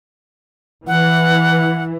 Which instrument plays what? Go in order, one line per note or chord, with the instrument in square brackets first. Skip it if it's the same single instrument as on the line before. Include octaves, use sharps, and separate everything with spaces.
[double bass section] E3 [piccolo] F#5